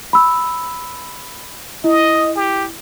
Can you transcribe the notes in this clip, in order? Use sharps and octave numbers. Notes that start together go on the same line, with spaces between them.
B5 E6
E4 D#5
G4